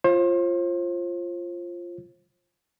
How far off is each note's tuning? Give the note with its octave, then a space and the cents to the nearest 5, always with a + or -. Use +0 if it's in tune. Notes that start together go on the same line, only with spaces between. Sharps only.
F4 -10 C5 +35